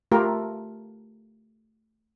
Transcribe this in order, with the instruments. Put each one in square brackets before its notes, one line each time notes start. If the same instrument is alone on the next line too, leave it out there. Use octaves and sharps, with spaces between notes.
[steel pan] A3 F4 G4 A#4